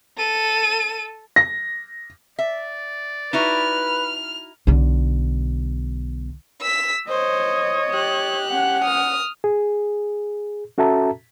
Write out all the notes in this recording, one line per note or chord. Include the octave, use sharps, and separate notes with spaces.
A4 D#7
A#6
D5 E5
D#4 E4 F#4 B4 F6
B1 D3
E6 B6
C5 C#5 D#5
G4 F#6
C#4 F#5
D#6 F6
G#4
C#4 F#4 A4 E5 A5 A#5